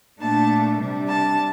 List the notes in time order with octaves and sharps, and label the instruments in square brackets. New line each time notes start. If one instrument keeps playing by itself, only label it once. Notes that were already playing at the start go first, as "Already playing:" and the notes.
[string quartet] A#2 A3 D4 A5
C3 G3 D4
A5